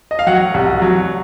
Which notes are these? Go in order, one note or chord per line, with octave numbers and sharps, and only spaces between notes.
D#5
F5
F#3 F#5
C2
F#3